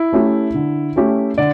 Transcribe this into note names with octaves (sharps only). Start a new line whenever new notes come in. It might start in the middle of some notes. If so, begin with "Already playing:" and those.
Already playing: E4
A3 C#4 G4
D3
A3 C#4 G4
D3 D5